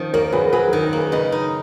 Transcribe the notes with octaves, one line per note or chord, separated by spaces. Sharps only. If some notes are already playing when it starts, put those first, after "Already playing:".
Already playing: D#3 F3 C#4
A#3 A#4 C#5
F#2 G#4 B4
F#3 G#4 B4
A#4
D#3
A#4
A#3 G#4 B4
C#3 B4 D#5
D#4